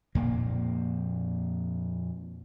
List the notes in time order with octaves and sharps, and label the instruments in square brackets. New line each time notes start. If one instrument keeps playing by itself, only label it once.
[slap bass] F2 A#2 A#3